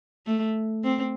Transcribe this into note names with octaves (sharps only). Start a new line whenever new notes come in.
A3
C4